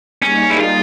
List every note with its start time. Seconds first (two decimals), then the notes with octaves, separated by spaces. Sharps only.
0.22 G3 A#3 C#4 D#4 G#4
0.50 E4
0.60 F4